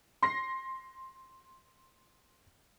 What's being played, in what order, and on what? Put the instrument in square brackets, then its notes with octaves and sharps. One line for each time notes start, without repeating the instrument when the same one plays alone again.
[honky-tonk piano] C6 A#6 C7